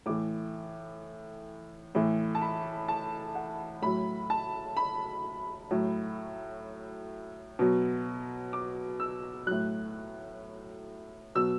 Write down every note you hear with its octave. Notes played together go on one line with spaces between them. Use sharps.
A2 E3 D6
A2 E3
A5
B5
A5
F#5
A2 F#3 B5
A5
B5
A2 F#3
B2 F#3
D6
E6
A2 F#3 F#6
B2 F#3 E6